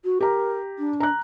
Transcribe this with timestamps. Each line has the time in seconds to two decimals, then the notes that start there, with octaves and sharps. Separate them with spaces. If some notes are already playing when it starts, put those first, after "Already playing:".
0.04 F#4
0.21 G4 A#4 A#5
0.78 D4
1.00 A#5 F#6